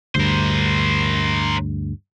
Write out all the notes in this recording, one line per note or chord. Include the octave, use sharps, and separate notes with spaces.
D2 G2 A#4 C5